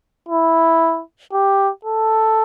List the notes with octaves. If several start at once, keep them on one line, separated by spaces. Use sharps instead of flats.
E4
G4
A4